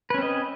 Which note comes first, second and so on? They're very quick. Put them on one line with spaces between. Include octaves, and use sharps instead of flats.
B4 C#4 C4 D#5